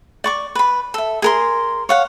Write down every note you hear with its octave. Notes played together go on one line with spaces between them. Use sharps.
D5 C#6 D6
B4 B5
A4 E5
G#4 A#4 C6
C#5 F5 F#5